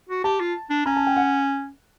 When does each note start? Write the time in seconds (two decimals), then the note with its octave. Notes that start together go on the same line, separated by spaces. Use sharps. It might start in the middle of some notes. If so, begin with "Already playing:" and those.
0.09 F#4
0.24 G4 A5
0.40 F4
0.70 D4
0.86 C#4 A#5
0.96 A5
1.07 G5
1.16 F#5